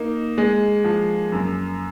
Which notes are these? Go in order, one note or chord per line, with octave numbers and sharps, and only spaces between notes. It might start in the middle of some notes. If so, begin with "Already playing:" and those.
Already playing: A#3 D#4
G#3
F3
F#2